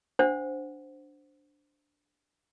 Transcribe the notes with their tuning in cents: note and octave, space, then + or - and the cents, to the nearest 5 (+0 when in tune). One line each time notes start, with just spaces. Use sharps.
D4 +0 C5 +0 F#5 +0